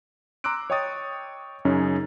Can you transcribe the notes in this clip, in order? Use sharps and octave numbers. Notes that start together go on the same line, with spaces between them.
A#5 C6 D6 E6 F#6 D7
C#5 D#5 G5 C#6 D#6 A6
F#2 C#3 C#4 D#4